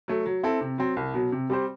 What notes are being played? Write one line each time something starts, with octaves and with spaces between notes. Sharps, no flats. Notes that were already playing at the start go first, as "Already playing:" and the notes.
F#3 A3
F#3
C4 E4 A4
C3
F#3 C4
C2
B2 F#3
C3
G3 C4 G4 C5